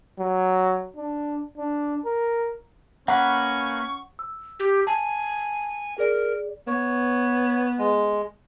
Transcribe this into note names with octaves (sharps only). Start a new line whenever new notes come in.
F#3
D4
D4
A#4
A#3 C#4 B4 F#5 C#6
E6
G4
G#5 A5
G#4 A#4 D5
B3 C#5
G#3